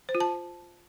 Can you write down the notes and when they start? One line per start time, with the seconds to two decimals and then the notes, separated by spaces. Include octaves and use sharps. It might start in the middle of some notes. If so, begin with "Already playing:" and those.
0.09 C5
0.15 F4
0.20 A5